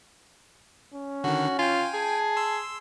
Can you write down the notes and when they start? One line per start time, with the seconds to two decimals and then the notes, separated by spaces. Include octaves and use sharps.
0.94 C#4
1.24 D3 D#3 F#4
1.59 F4 G5 G#5
1.94 G#4 A5
2.37 C6 E6